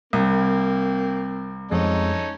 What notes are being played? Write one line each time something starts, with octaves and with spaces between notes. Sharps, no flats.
C2 A#3 C4
F2 F3 G#3 C#4 D#4 A4